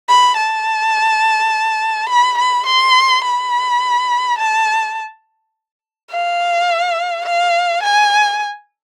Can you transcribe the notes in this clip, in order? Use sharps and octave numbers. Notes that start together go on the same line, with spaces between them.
B5
A5
B5
B5
C6
B5
A5
F5
F5
G#5